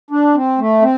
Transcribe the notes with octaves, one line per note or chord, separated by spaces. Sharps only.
D4
C4
A3
C4